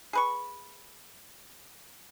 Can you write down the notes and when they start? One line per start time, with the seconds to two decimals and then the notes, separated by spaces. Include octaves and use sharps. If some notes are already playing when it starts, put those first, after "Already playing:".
0.13 G#4 B4 C#6